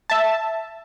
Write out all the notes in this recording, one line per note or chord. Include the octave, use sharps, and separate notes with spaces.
E5 A5